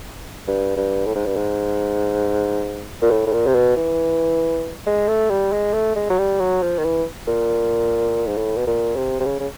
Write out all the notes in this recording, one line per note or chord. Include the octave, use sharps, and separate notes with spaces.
G2
G2
A2
G#2
G2
G#2
A#2
A2
A2
A#2
C3
B2
E3
G#3
A3
G3
G#3
A3
G#3
F#3
G3
F#3
F3
D#3
E3
A#2
G#2
A2
B2
A#2
C3
C3
C#3
C#3